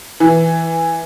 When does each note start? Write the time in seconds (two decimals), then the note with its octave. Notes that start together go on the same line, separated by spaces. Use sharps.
0.20 E3